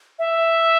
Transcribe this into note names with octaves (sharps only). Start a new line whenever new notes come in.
E5